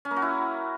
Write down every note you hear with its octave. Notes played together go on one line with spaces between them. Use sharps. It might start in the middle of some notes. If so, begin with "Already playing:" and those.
C#4
A#3
F#4
E4